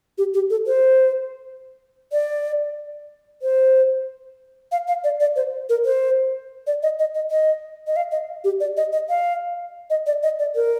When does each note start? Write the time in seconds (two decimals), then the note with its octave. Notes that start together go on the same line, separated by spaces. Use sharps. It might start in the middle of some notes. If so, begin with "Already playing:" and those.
0.18 G4
0.34 G4
0.50 A4
0.67 C5
2.12 D5
3.42 C5
4.72 F5
4.88 F5
5.04 D5
5.20 D5
5.36 C5
5.69 A#4
5.85 C5
6.67 D5
6.83 D#5
6.99 D#5
7.15 D#5
7.31 D#5
7.87 D#5
7.96 F5
8.12 D#5
8.44 G4
8.60 D5
8.77 D#5
8.93 D#5
9.09 F5
9.90 D#5
10.06 D5
10.23 D#5
10.39 D5
10.55 A#4